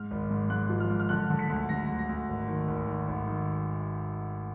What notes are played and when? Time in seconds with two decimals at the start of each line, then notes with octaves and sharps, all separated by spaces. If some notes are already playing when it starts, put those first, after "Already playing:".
Already playing: G#2 F6
0.11 G#1
0.30 G#2
0.50 G#2 F#6
0.69 F3
0.80 F6
0.90 G#2
1.00 F6
1.09 D3 F#6
1.30 D3
1.39 B6
1.49 D2
1.69 D3 A#6
1.89 D2
1.99 A#6
2.09 D2
2.29 G#1
2.48 D#3
2.68 G#1
2.88 D#3
3.08 G#1
3.28 D#3